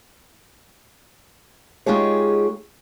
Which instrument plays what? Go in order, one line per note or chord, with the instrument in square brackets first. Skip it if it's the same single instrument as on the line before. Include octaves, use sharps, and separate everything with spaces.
[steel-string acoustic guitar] G#3 D#4 F4 G4 G#4 C#5